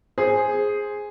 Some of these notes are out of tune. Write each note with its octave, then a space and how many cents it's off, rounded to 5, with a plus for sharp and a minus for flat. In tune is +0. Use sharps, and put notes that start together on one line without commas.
G#4 +0 C5 +5